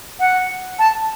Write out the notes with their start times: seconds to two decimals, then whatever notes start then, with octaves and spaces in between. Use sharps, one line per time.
0.20 F#5
0.79 A5